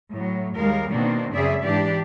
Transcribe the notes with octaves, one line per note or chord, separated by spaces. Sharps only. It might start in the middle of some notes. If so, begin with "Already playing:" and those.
A2 F#3
D#2 G3 G#3 A#4 F5
B2 D#3 A#3 C4 D4
F#2 C#3 C4 G#4 D5 E5
G#2 E3 D4 G4 D5